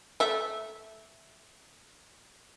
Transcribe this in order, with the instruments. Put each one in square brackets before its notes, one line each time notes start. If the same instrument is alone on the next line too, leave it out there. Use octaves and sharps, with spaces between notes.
[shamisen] A3 E5